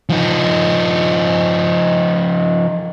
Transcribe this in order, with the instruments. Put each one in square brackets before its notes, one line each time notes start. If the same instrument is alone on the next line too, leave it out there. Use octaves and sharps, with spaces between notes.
[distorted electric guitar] F3 D#4